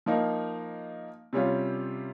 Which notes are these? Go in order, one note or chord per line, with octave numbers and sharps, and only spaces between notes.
F3 A#3 D#4
C3 G3 C#4 F4